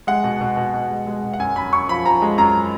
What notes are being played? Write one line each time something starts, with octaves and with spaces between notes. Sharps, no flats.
G#3 F#5
B2
B2
B2
B2
G#3
G#3
B2
F#5
F#2 G#5
F#2 B5
F#2 C#6
F3 B5
F3 A#5
G#3
F#2 A#5